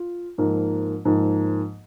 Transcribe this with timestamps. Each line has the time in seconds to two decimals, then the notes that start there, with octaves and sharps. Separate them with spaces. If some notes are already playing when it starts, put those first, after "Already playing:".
Already playing: F4
0.38 G#2 F3 A#3
1.05 G#2 F3 A#3